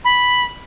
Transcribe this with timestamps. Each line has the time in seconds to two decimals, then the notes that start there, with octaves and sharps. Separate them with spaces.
0.04 B5